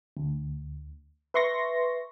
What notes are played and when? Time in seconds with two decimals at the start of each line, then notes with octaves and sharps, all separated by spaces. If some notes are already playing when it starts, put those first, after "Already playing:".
0.17 D2
1.34 B4 E5 C6 C#6 A#6